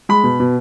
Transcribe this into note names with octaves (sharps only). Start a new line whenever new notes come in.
G#3 B5
B2
B2